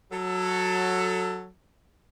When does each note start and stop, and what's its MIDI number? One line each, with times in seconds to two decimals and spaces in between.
0.12 1.48 54
0.12 1.48 69